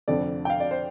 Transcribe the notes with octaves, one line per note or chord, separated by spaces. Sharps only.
F1 F2 D3 F3 D5
G5
F5
D5
C5